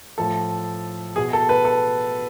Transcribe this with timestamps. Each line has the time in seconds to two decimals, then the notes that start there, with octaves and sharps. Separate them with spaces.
0.18 A2 F3 A4
1.16 B2 G#4
1.33 A4
1.49 B4
1.65 A4